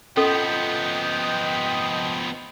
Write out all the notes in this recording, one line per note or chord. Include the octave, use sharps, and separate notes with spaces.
F3 B3 C#4 A4 D#5 G5